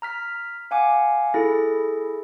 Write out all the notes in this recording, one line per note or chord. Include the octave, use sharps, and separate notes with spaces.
A#5 F6 B6
F5 F#5 G#5 D6
E4 G#4 A4 A#6